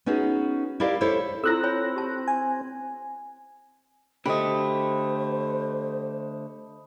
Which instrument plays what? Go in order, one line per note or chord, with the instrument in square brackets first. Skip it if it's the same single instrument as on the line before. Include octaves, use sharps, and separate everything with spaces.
[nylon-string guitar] B3 C#4 D#4 F#4 G#4
E4 G4 A#4 D5 D#5 F5
E4 A4 C5 C#5
[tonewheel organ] C4 [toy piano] E4 F4 A4 [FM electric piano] E6 F#6 A#6
[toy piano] C#5 G#5 B5
G4 A5
[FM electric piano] G#5
[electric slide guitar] D3 A3 [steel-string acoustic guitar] G4 [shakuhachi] C5 [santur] D#5 B5